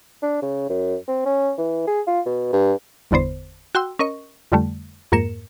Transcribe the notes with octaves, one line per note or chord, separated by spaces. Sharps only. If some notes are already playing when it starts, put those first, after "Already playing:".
D4
C#3
F#2
C4
C#4
E3
G#4
F4
B2
G2
G1 E2 D3 B3 C5
F#4 G5 C6 E6
C#4 A#4 D#5 C#6
F2 D3 G3 A3
F2 G#2 A#3 A#4 C#7 E7